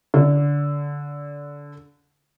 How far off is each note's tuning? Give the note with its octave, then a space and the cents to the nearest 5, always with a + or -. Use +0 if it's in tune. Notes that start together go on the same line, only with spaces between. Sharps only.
D3 -20